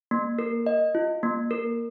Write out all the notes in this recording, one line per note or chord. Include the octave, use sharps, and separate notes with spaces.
A#3
A#4
D#5
F4
A#3
A#4